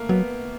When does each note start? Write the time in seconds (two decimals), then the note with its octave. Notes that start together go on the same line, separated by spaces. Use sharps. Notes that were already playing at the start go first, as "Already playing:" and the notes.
Already playing: A3 A#3
0.09 F#3 B3